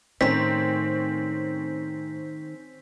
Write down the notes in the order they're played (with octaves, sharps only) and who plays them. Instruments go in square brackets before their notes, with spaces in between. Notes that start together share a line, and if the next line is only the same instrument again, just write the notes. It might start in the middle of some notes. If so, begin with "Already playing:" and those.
[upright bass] A2 [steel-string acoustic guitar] D#3 A3 [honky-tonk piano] C4 C#4 [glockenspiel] B6